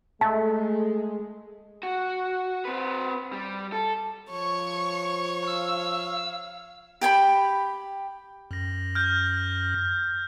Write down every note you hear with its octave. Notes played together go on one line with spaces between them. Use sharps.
G#3 A3 A5
F#4
C4 B4
G3
A4
F3 C#5 C#6
F5 E6
G4 G5 G#5 B5
F#2 A#6
F6 G6